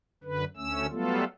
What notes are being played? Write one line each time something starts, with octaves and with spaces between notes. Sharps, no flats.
F#2 D3 B4
D2 A3 C#4 E6
F#3 G3 A3 B3 F4 A4